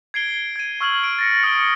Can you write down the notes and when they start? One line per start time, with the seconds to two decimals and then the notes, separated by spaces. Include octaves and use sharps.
0.14 G#6 C7 D7 G7
0.56 G#6 D#7
0.81 C#6 E6 F6 G#6 F#7
1.04 D7
1.19 A6 A#6 C#7
1.43 D#6 F6 C#7 D7 G7